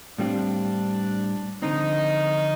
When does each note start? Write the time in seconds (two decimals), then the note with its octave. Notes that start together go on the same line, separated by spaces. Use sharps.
0.18 A2 G3 C4 D4 F4
1.62 D3 F3 C4 D#4